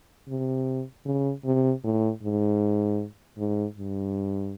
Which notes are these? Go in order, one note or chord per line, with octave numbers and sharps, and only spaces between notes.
C3
C#3
C3
A2
G#2
G#2
G2